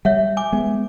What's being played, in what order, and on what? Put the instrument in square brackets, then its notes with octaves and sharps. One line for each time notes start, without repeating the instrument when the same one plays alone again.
[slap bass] G3 [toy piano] C#5 E5 F#5
[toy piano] G#5 D6
[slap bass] G#3 B3